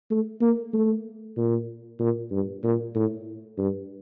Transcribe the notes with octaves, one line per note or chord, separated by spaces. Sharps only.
A3
A#3
A3
A#2
A#2
G2
A#2
A2
G2